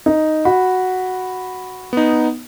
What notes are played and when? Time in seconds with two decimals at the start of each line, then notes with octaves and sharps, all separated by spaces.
0.06 D#4
0.45 F#4 B5
1.93 B3 D#4